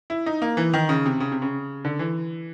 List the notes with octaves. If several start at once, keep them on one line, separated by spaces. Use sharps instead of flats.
E4
D#4
A#3
E3
D#3
C#3
C3
C#3
C3
C#3
D3
E3